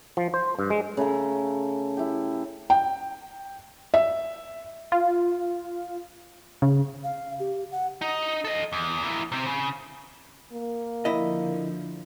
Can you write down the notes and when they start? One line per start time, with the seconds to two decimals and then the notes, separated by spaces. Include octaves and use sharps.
0.17 F3
0.34 C5
0.59 G2
0.70 G#3
0.97 C#3 A3 A4 A#5
1.97 E4 G4
2.70 G5
3.94 E5
4.92 F4
6.62 C#3
7.04 F5
7.40 G4
7.72 F#5
8.01 D#4
8.45 A4 D#5
8.73 E2
9.03 A#3 E4
9.32 C3 C4
9.47 C#3
10.52 A#3
11.05 D3 F3 E4 D#5